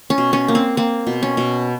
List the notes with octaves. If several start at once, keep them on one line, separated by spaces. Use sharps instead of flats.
C#4
B2
C#4
A#3
C4
A#3 C4
B2
C#4
B2